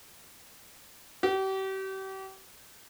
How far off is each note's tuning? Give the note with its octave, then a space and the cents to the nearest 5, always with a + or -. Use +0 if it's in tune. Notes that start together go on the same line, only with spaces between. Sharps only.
G4 -35